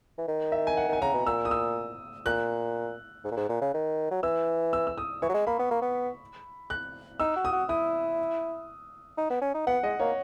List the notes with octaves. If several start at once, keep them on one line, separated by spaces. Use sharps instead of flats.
E3
D#3
E5
G#5
F#5
D#3 G#5
C#3 A#5
B2
A#2 E6
D#6
E6
A#2 F#6
G#2
A#2
G#2
A#2
C#3
D#3
F#3
E3 E6
E6
E6
D#6
E3 C#6
F#3
G#3
A#3 B5
B3
A#3
B3
F#6
D#4 E6
F#4
D#6
F#4
E4 D#6
D#4
B3
C#4
D#4
B3 F#5
G#3 D#5
A#3 C#5